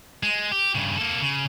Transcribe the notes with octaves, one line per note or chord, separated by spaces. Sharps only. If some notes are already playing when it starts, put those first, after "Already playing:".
G#3
G4
G2 C#3
A#3 A4
C#3